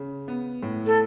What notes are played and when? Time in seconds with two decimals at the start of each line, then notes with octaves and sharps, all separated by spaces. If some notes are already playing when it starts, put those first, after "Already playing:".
Already playing: C#3
0.28 B3
0.63 A2
0.87 A4